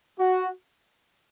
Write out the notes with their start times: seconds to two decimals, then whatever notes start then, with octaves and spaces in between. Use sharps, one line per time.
0.19 F#4